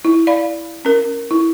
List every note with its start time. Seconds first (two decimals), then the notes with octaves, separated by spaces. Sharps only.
0.05 E4
0.27 D5 F5 B5
0.85 C#4 A#4
1.31 E4